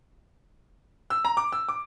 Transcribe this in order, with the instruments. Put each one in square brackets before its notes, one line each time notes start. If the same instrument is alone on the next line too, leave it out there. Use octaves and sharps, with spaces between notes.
[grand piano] E6
A#5
D6
E6
D6